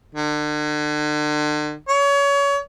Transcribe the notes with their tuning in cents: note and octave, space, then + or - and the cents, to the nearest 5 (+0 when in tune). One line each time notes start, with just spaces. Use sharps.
D3 +40
C#5 +30